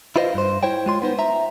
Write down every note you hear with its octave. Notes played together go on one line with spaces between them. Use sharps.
E4 F4 B4 C5 D#5 F5
G2 C5
E4 C5 C#5 G5
G#3 F4 C6
B3 D#4 C5
E5 A#5